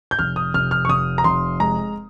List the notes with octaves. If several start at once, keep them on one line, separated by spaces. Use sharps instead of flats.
G6
F1 F6
D#6
F1 F6
F6
C#6
F1 D#6
A#5
F1 C6
G#3 A#5